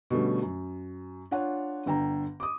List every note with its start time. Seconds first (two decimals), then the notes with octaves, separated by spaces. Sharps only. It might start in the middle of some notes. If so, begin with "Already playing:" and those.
0.11 B2 D3 G3 A3 C#4
0.42 F#2
1.31 D4 F4 C#5 F#5
1.86 G1 D3 G5 A#5
2.40 D6 D#6